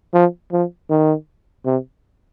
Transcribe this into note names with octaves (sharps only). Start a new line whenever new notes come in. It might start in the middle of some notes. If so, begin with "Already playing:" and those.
F3
F3
D#3
C3